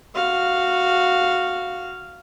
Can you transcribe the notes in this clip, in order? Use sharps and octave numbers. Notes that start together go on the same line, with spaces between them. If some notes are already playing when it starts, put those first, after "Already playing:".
F#4 F5